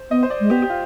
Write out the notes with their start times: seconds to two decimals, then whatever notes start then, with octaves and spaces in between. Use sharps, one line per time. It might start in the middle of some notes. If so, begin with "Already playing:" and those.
Already playing: C5
0.11 B3 D#5
0.23 C5
0.30 D5
0.40 G#3
0.50 B3 G4
0.62 G4
0.70 F4